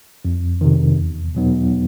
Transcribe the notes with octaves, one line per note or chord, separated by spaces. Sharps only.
F2
C3 D#3
E2
B2 F#3 B3 D#4